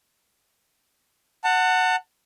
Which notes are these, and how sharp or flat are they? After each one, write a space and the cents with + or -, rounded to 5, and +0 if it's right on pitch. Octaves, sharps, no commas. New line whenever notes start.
F#5 +0 A5 +30